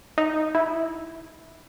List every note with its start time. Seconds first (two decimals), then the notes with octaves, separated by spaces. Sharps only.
0.18 D#4
0.55 E4